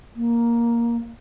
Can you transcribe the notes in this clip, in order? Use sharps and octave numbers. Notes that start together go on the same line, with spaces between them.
A#3